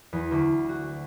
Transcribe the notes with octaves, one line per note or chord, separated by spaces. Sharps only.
E2
D2
F#4